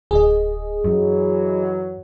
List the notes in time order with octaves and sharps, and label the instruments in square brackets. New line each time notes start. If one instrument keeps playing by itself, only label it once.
[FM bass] D1 [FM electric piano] G#4 D#5
[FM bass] F#2 [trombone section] E3 F#3